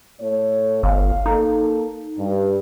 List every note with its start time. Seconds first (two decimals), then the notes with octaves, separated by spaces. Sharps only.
0.21 A2 A3 C#5
0.83 G1 F5
1.26 A#3 D#4 A4
2.18 G2